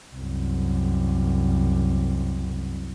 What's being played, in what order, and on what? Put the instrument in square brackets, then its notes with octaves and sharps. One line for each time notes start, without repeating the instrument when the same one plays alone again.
[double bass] C2 F#2